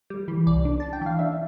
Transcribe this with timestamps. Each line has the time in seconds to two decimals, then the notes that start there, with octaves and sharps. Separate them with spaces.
0.10 G3
0.28 E3
0.47 C2 D5
0.65 D4
0.80 D4 A5
0.93 G5
1.01 E3 F5
1.19 D4 E5